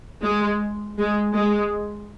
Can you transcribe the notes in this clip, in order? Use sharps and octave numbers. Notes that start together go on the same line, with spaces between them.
G#3
G#3
G#3